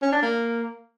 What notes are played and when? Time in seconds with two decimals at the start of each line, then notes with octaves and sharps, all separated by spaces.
0.02 C#4
0.12 D4
0.22 A#3